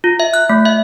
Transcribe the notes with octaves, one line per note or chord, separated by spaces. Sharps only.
F4
E5
F#6
A3
E5